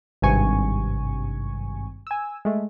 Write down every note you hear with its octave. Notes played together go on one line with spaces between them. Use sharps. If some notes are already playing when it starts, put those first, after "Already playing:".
G#1 G2 C3 G#5 C#6
G#5 E6
G#3 A3